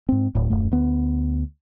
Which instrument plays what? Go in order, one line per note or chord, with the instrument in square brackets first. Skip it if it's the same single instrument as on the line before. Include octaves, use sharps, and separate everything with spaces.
[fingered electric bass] G#2 C4
D1 A2
D#1 F#2 A3
D2 B3